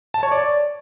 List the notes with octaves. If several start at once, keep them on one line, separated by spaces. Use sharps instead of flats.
A5
C#5
D5